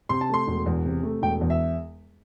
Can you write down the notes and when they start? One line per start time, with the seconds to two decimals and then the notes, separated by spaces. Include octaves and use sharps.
0.09 C3 C6
0.21 A5
0.29 A3 C6
0.47 E1
0.66 E2
0.85 C3
1.03 A3
1.22 E1 G5
1.41 E2
1.50 E5